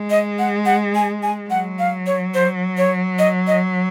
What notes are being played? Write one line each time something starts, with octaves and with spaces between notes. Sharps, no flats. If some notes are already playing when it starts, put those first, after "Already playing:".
Already playing: G#3
D#5
F#5
F#5
G#5
G#5
F#3 F#5
F5
C#5
C5
C#5
D#5
D#5